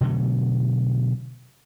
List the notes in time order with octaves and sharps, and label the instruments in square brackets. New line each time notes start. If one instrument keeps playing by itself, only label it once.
[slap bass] B2 D3 F#3 A3